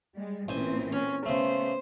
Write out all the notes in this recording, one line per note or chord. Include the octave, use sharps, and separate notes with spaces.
G3 G#3
A1 A#2 E3 C4 C5 G#5
C#4 C#5
C#3 A3 B3 C5